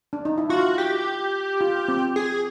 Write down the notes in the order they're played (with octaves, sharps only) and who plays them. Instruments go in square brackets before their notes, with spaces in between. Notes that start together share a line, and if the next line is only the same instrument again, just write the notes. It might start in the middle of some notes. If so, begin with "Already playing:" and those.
[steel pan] D4
D#4
E4
[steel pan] F4 [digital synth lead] F#4
[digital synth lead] G4
[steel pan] F4
C4
[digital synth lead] G#4